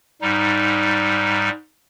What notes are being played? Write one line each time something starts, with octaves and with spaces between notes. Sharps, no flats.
G#2 G3 D#4